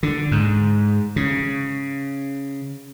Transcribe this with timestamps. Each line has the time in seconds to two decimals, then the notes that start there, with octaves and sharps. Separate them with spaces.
0.03 D3
0.32 G#2
1.16 C#3